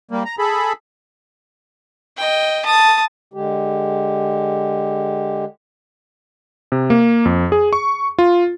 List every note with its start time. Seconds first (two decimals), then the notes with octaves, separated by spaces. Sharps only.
0.11 G3 A#3
0.25 A#5
0.39 G#4 A4 B5
2.17 D#5 G5
2.65 A5 D#6
3.34 D3 G#3 G4
6.72 C3
6.90 A#3
7.25 F2
7.52 G#4
7.73 C#6
8.19 F4